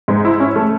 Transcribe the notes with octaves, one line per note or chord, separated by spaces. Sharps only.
G#2
E4
C#4
A3